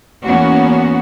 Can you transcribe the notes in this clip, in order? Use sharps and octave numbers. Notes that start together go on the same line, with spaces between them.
E2 A#3 B3 C#4 F#4